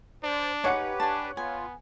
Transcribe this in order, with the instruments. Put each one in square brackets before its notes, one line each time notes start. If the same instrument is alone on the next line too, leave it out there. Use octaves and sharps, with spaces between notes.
[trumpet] D4 [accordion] C5 D5
[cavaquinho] D#4 G#5 D6 [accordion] G4 B4 [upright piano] C#5 F#5 C#7
[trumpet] D4 [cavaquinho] G#5 A5
[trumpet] B3 [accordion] F4 [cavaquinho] G#5